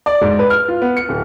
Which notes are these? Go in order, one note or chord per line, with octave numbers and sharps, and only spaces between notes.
D5
G#2
B4
F6
F4
B3
C#7
D1